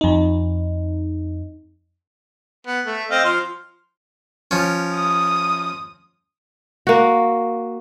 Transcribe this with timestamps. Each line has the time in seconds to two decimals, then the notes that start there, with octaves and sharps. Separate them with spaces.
0.01 F2 D#4
2.67 B3
2.86 A3
3.11 C4 D#5 F5
3.25 F3 C6 F6
4.51 F3 C#4
4.94 D#6
6.87 A#3 F#4